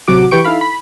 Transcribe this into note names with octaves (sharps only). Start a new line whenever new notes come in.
A1 C3 F#3 F#4 D6
E3 G4 B4 G5 C#6 D7
D#4 E4 A4 F5 B5
B5